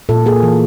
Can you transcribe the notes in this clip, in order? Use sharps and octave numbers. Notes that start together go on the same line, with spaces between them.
A#2 A4
A#3 G#4
E3